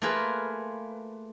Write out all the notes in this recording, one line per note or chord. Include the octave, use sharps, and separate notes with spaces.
A3 A#3 F4 G#4 A#4 B4